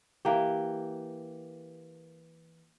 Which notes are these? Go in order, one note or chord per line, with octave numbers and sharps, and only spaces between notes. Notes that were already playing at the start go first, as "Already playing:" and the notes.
E3 A#3 G4